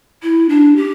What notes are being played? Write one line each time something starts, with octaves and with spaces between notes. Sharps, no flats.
E4
D4
G4